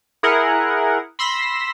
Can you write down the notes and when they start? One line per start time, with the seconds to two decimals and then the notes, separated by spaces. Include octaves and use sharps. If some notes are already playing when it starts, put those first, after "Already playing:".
0.23 E4 G#4 A#4 F#5
1.19 B5 C6 E6 A#6 B6